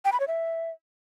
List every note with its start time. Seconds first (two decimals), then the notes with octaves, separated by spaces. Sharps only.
0.05 G5
0.12 B5
0.20 C#5
0.28 E5